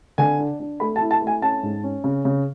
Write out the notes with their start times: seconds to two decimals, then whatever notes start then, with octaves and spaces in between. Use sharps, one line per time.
0.18 D3 G#5
0.39 D4
0.60 D4
0.80 A3 B5
0.96 A5
1.01 E4
1.11 A5
1.22 A3
1.27 G#5
1.42 C#4 A5
1.63 G#2
1.84 C#4
2.04 C#3
2.25 C#3